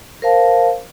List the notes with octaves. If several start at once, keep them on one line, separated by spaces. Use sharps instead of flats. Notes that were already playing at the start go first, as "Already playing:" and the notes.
A#4 C5 F5 A5